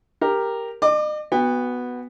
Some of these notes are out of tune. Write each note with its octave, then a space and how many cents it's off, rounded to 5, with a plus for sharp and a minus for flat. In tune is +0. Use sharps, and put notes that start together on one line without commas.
G4 +10 A#4 +0
D#5 -40 D6 +20
B3 +0 F#4 +0 G5 +45